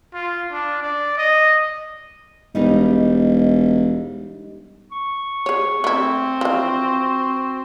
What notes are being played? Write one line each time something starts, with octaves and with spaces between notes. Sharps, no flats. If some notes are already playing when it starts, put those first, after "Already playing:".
F4
D4
D5
D#5
E1 G3 D#4
C#6
G#4 C#5
A3 C4 E4
E3 F3 F#4